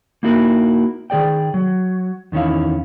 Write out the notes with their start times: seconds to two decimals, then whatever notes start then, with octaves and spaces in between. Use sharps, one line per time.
0.23 A#3 D#4 E4 F#4 A#4
1.10 D#3 G#4 D5 G5
1.54 F#3
2.32 E2 D#3 C#4 E4 F5